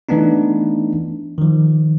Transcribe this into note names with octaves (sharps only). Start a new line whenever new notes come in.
E3 A3 B3 D4 D#4
D#3 F3